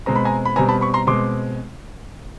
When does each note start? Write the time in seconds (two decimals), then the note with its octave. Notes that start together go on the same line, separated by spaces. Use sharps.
0.06 B2 G#3 C4 A#5
0.16 B5
0.25 G#5 A#5
0.45 B5
0.56 B2 G3 C4 G#5 A#5
0.69 A5 B5
0.81 B5 C#6
0.94 A#5 C6
1.07 B2 G#3 C4 C6 D6